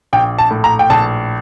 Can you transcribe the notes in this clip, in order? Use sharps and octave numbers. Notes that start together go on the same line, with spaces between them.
A#1 G5
A5
A2
A#5
G5
A#1 A5